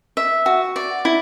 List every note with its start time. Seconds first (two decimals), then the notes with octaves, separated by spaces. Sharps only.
0.17 E5
0.46 F#4
0.76 D5
1.05 E4